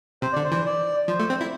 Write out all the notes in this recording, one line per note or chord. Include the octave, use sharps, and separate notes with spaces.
C3 C5
D3 D5
C5
E3
D5
F3 C5
A3
C4
E4